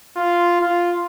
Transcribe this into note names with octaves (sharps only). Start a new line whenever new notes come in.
F4
F4